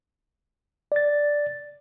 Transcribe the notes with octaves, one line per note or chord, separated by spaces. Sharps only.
D5 A6